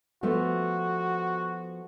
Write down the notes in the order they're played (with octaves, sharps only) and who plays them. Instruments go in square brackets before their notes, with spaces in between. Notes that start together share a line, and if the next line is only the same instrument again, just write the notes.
[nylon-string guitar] F3 A3 B3 [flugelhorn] F#4